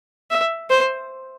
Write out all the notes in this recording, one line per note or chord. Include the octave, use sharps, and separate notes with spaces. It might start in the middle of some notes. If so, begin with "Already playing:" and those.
E5
C5